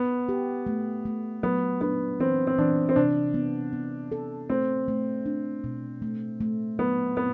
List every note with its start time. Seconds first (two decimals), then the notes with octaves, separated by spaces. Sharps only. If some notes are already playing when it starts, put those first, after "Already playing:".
Already playing: B3
0.29 G4
0.67 A3
1.05 A3
1.43 F#3 B3
1.81 B3 D4
2.20 E3 C4
2.47 C4
2.58 E3 D4
2.89 C4
2.96 C3 D4
3.34 B3
3.73 B3
4.12 A4
4.50 A3 C4
4.88 A3
5.26 D4
5.64 B2
6.02 A3
6.41 A3
6.79 F#3 B3
7.17 B3 C4